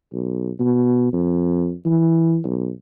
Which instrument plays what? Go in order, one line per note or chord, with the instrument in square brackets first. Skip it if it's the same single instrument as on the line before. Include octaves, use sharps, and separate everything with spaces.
[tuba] B1
B2
F2
E3
B1